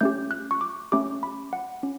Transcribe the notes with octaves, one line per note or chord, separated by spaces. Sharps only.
A3 C#4 G4 G6
F#6
C#6
D6
A3 C#4 G4 D6
B5
F#5
C#4